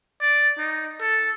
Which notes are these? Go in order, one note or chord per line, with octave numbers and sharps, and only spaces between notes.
D5
D#4
A4